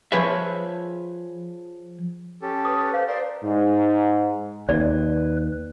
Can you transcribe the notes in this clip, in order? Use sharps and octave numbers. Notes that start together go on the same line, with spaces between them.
F3 G#4 B4 C#5 E5
C#4 G4 A4
B4 D#6
C5 F5
A#4 C5 D5 C6
G#2
D#2 B4 D5